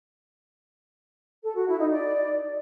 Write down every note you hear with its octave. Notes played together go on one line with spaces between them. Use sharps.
A4
F#4
E4
D#4
D5